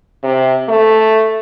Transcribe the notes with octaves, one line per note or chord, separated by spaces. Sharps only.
C3
A3